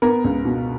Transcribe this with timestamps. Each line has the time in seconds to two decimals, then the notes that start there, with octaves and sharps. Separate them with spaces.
0.02 B3 A#4
0.24 C#2
0.45 B2